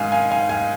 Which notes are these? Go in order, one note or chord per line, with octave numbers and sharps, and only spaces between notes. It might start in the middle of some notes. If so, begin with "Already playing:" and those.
Already playing: G#2 D#3 F5 G#5
F5 G#5
F5 G#5
F5 G#5